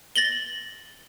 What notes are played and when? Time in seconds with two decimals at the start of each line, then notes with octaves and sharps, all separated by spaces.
0.16 A6 A#6 F#7 G7